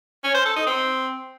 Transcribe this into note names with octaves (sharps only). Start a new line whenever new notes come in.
C#4
C5
A4
D#4
C4